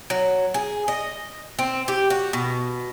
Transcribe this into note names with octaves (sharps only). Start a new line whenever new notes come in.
F#3
G#4
D#5
C4
G4
F#4
B2